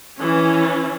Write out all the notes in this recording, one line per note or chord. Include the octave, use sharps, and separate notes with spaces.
E3 C#4